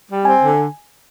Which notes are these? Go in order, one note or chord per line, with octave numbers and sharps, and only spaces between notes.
G3
C4 G#5
D3